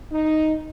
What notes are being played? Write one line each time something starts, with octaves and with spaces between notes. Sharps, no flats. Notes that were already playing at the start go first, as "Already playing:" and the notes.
D#4